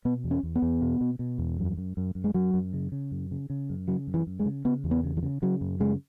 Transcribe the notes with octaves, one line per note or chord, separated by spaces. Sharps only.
B2 B3
E2
C#4
E2
B3
E2
B2
B2
B2
E2
F#2
F#2
F#2
F#2
G#3
F#2 F#3
F#2
C#3
C#3
F#2
C#3
C#3
F#2
C#3 F#3
F#2
E3
F#2
G#3
C#3
C#3 B3
E2
B3
C#3
E3
C#3
C#3 F#3
F#2
C#3 G#3